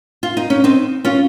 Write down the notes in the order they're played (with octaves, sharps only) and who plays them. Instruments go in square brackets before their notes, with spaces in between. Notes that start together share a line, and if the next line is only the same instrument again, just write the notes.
[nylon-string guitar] F4
D#4
C#4
C4 D#4
C#4 F4